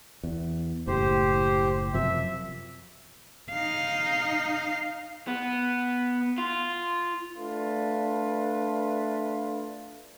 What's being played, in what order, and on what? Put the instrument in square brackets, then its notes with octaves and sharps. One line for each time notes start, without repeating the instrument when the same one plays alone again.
[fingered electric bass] E2
[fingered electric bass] F#1 A2 [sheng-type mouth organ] G4 C5
[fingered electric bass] F#2 C3 F3 [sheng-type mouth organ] E5
[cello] D#4 F5
[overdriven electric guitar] B3
F4
[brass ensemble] A3 D4 F4 B4